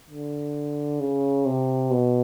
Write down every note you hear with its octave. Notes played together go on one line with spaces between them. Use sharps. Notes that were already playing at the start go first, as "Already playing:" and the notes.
D3
C#3
C3
B2